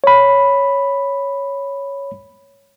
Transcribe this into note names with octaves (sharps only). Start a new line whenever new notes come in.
C#5 B5